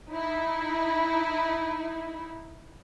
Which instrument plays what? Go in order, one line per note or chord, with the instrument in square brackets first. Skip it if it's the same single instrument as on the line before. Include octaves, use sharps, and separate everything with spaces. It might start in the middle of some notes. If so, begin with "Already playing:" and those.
[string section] D#4 E4